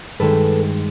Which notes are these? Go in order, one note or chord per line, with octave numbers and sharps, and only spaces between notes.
G2 D#3 G#3 A4 B4